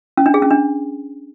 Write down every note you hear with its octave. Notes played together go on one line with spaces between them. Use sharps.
C#4
D4
G#4
C#4
D4